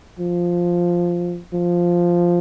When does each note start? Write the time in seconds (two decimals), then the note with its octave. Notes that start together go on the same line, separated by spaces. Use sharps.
0.19 F3
1.54 F3